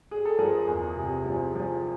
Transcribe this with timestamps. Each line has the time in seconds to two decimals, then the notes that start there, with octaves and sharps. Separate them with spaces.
0.11 G#4
0.25 A4
0.39 F3 G#4 A#4
0.67 E2
0.96 C3
1.25 F3
1.55 F3